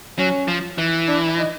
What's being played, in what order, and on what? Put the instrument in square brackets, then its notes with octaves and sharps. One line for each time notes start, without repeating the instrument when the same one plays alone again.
[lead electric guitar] F#3 [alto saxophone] C#4
[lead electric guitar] F3
E3
[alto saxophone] D4
D#4